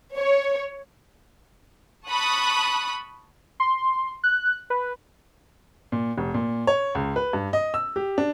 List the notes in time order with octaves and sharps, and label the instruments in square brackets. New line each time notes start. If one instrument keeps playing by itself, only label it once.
[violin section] C#5
A5 B5 C#6 D#6 F#6
[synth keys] C6
F#6
B4
[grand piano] A#2
F1
A#2
C#5
C#2
B4
G2
D#5
E6
G4
D4